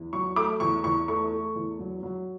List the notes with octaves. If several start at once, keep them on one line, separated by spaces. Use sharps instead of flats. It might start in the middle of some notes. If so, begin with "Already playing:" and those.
Already playing: E2
F#3 C#6
A3 D6
E2 C#6
E2 C#6
A3 C#6
A3
E2
F#3
F#3